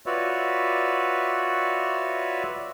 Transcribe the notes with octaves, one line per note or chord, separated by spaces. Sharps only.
F4 F#4 B4 C#5 D5 E5